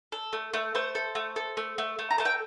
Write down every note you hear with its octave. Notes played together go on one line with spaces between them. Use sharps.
A4
A3
A3
A3 C5
A4
A3
A4
A3
A3
A3
A#5
A3 A5
G5